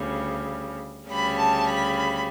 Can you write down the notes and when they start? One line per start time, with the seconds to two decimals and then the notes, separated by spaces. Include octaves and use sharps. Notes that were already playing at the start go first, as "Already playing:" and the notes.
Already playing: D2 C#3 G3
1.08 D2 C#3 G3 B5
1.37 A5
1.65 B5
1.95 B5